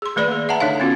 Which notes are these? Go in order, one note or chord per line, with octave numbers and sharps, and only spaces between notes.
G#4 C6
D#3 A3 B4 D5 B5
A#3 G#4
E5 F#5 A5 A#5
D3 D4 D#4 C#5 F5
B3 C#4 F4 F#4